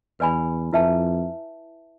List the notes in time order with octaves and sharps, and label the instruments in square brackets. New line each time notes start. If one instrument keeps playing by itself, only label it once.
[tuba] E2 [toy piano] B4 D5 G#5 B5
[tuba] F2 [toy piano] E4 B4 E5 A5